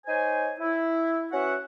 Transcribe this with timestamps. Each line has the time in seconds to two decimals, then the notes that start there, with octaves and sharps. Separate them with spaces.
0.06 D#4 C5 C#5 G#5
0.61 E4
1.33 C#4 F#4 B4 E5 F#5